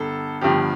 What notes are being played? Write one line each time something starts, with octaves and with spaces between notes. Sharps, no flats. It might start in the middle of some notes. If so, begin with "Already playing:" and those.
Already playing: G1 A4
G1 G2 F3 G4